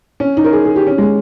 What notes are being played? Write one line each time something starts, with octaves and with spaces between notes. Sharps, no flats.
C#4
D#4
A#4
G#4
G#4
G4
C#4
G#3